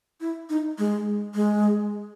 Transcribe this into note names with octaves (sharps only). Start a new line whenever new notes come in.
E4
D#4
G#3
G#3